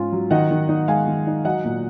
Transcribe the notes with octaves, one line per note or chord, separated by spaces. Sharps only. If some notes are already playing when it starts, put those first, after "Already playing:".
Already playing: G#2 C#4 F4
F#3
D#3 D#5 F#5
D#3
D#4
G#3 F5 G#5
D#3
D#4
F#3 D#5 F#5
A#2